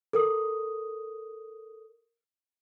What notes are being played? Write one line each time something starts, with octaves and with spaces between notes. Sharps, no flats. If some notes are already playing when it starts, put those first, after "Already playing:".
A4 A#4 D#6